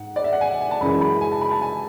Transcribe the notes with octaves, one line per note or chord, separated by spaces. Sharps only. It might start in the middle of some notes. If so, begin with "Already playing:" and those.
Already playing: G#2 F#5
D5
E5
F#5
G#5
F#5
G#5
A5
F#2 C#3 E3 G#3 B5
B5
G#5
A5
B5
A5
G#5